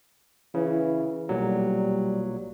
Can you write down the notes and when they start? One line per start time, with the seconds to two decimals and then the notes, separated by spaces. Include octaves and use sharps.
0.54 C#3 E3
1.29 B1 A#2 F#3 G3